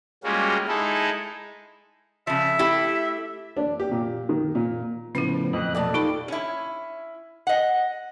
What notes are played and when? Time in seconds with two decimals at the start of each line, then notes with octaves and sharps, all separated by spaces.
0.24 G3 G#3 A#3 C#4 F4 F#4
0.68 G#3 D#4 E4 A4
2.27 C#3 F3 E5
2.59 A3 E4 G4
3.57 D4
3.80 G4
3.91 A#2
4.29 D#3
4.55 A#2
5.15 D2 A2 C#3 F3 B3 C#4 E4 C5
5.53 F2 D#5 F#6
5.75 B2 F#3 A#3 A4 D5 D#5 A5
5.94 E2 D#4 F4 G4 A4 B5
6.28 C#4 E4
7.47 D#5 F#5